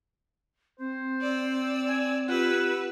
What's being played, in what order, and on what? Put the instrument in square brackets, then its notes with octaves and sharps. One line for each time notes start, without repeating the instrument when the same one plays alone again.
[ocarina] C4 [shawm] C5
[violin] D5 E6
[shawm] G#5
[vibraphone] F4 G4 [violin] B4 E6 [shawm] F#5